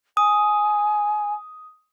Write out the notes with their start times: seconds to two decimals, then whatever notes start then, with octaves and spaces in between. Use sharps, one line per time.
0.17 G#5 D#6